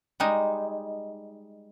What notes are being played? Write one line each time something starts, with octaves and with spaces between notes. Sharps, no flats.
G3 G#3 D#4